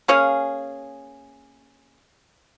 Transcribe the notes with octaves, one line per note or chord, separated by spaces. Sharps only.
A#3 C#4 G#4 F5